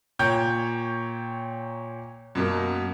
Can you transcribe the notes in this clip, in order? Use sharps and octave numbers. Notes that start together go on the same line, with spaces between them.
A#2 C#5 G5 A#5 G6 D7
F#2 B2 A#3